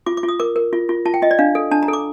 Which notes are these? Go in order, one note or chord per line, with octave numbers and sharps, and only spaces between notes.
F4 D6
D6
F4
D#6
A#4 D6
A#4
F4
F4
F4 A5
G5
F4 D#5
D5
D4 F5
A4
D4 A5
A#5
A4
D6